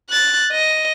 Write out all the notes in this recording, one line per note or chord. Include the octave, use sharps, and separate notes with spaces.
F#6 A6
D#5